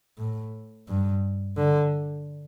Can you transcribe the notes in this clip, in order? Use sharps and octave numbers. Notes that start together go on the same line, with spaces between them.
A2
G2
D3